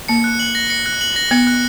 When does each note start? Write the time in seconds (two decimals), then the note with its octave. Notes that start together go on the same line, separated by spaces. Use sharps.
0.09 A#3 C#7
0.24 F#6
0.39 F#7
0.55 A#6
0.70 C#7
0.86 F#6
1.01 F#7
1.16 A#6
1.31 B3 C#7
1.47 F#6